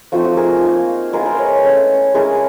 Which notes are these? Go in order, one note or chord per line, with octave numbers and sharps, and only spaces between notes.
F3 A3 C4 D#4 F#4
F#4
G#4 A#4
A#3 D#4
G#3 B3 E4 G#4 A#4
A#4 C5
B4 C#5
A3 C#4 E4
G#3 C#4 E4 G#4 A#4